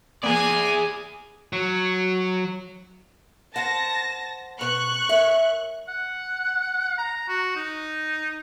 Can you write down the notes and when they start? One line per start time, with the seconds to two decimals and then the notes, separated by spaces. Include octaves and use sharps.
0.24 A#3 B3 G#4 D5 G#5
1.53 F#3
3.56 A#4 C5 F#5 A5 A#6
4.61 B2 C#6 F#6
5.09 A#4 C#5 E5
5.88 F#5
6.98 A#5
7.28 F#4
7.56 D#4